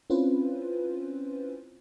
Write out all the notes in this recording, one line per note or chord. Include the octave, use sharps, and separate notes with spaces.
C4 C#4 E4 F4 B4 C5